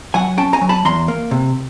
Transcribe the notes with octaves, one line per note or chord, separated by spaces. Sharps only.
F#3 F#5 G#5
C#4 G5 A5
G#5 A#5
F#3
A5 B5
E2 A#5 C6
A#3
C3